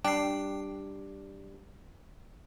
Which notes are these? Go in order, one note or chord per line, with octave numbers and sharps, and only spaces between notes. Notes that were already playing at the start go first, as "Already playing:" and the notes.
G3 D4 G5 C7